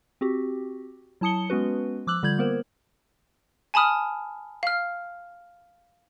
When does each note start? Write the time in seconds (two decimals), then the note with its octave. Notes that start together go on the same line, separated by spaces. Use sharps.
0.21 C4 F#4 G4
1.21 F#3 E4 A5 D#6 C#7 G7
1.50 G#3 B3 C#4 F#4 B4
2.07 F3 D6 E6 F#6 F#7
2.23 D3 G3 F4 G6 G#6 F#7
2.38 A#3 B3 A#4 C5
3.74 G#5 A5 B5 D#6 F6
4.63 F5 F6